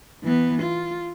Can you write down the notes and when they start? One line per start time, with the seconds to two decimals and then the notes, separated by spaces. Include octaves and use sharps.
0.23 E3 B3
0.62 F4